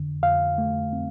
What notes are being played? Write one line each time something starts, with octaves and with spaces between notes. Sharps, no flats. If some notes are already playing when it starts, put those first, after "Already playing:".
Already playing: F2 D3
F2 F5
A3
C4